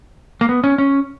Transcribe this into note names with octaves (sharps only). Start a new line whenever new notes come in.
A#3
B3
C#4
C#4